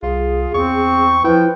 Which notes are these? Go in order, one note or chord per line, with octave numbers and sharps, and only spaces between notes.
C2 F4 G#4
E2 C4 C#6
F3 E4 B4 G5